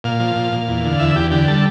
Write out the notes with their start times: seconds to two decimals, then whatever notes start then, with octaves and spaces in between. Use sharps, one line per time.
0.04 A#2 F5
0.20 F3
0.36 A#2
0.52 A#2
0.68 E2
0.84 D3
0.99 E2 E5
1.16 E2 G4
1.31 D3 G4
1.48 G3 A4